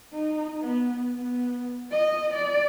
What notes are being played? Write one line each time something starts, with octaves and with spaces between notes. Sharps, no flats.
D#4
B3
B3
D#5
D5